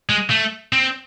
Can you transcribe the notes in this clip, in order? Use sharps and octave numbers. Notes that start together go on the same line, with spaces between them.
G#3
A3
C4